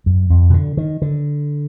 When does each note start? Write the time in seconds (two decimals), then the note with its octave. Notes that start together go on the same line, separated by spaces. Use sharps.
0.06 F#2
0.30 F2
0.50 B2
0.54 D3
0.77 D#3
1.02 D3